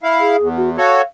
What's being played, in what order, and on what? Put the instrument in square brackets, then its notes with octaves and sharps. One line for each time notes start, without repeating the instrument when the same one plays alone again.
[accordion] E4 F5
[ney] G#4
[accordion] E2
[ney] F#4
[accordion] F#4 A4 C#5 [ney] F5